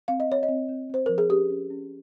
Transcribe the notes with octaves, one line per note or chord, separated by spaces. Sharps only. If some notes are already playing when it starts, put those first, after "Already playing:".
C4 F5
D#5
C4 C#5
D#5
C4
C4
C4 C5
F3 A#4
G#4
C#4 G4
C#4
C#4